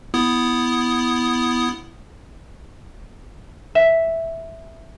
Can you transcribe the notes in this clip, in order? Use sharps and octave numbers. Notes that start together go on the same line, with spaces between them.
B3 E4 D#6
E5